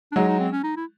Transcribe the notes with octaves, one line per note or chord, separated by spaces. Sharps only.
D4
F#3 G#3 D#4
D#4
C4
C#4
D#4
E4